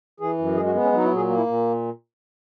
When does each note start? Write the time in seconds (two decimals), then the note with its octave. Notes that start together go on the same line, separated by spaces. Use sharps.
0.20 E3 G#4
0.38 F#2
0.56 G#3 G#4
0.66 F#4
0.74 B3
0.83 C#4
0.92 F#3 D#4
1.05 E4
1.11 A#2 G#4
1.29 A#3
1.37 E4
1.46 A#2